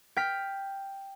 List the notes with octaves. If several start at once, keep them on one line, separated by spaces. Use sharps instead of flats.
G5 F6 B6